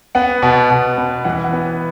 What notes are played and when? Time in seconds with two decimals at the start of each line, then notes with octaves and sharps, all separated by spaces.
0.15 B3 F#5
0.42 B2
0.70 B2
0.98 B3
1.25 E3 F#5
1.44 F#5
1.53 B3